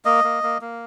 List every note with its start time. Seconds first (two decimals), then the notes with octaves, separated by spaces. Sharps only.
0.05 A#3 D#5
0.24 A#3
0.43 A#3
0.61 A#3